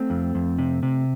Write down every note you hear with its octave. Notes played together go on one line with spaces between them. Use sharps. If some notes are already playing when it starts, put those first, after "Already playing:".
Already playing: A3 C4
F2
F2
C3
C3